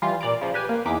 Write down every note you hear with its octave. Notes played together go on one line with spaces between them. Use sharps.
E3 G3 F4
A#2 D5 A#5 D7
C#3 F3
G4 B4 G#5
A#3
E2 D#4 G#4 D6 B6